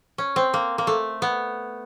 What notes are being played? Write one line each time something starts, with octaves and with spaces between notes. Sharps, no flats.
C#4
C4
A#3
A#3
A3
B3